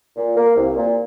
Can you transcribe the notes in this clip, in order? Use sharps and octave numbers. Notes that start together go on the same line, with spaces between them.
A#2
A#3
C2
A#2